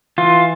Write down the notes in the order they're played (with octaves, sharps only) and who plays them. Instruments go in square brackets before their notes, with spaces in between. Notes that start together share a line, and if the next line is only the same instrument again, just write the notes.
[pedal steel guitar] E3 F4